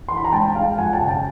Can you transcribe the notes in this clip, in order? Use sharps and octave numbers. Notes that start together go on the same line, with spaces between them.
E3 C6
B5
A#5
G#2 G5 A5
G#3 F5 G5
F2 F#5 G#5
G5 A5
C#3
G5 A5